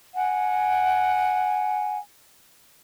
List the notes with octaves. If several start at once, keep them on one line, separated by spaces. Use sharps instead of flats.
F#5 G#5